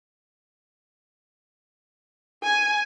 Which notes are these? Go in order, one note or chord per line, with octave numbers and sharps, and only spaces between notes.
G#5